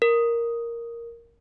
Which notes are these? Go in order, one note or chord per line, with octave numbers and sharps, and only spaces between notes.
A#4